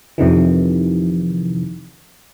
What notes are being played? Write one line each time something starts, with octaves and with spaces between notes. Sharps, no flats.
F2 C3 D#3 E3